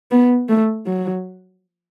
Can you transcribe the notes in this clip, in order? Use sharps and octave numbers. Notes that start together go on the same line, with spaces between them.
B3
A3
F#3